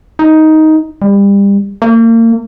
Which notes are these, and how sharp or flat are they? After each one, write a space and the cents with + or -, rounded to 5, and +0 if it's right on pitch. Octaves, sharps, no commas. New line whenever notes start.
D#4 +10
G3 +30
A#3 -35